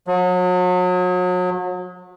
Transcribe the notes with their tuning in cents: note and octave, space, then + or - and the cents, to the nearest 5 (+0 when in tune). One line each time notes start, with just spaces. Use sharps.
F#3 -35